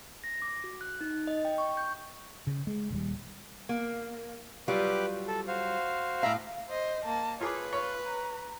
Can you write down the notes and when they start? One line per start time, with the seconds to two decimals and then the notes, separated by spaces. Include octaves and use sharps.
0.24 A#6
0.42 D6
0.64 F#4
0.81 F#6
1.01 D#4
1.27 D#5
1.45 G5
1.58 C#6
1.77 G6
2.47 C#3
2.67 G#3
2.90 D#1 D#2 G3
3.69 A#3
4.68 F#3 G3 F4 G4 B4 D6
5.28 A4
5.48 F#4 C5 F5
6.23 A2 E5 F5 A#5 B5
6.70 C5 D#5
7.05 A#3 A5
7.41 F4 G#4 B4 C#5 D6
7.73 F4 C#5
8.06 A#5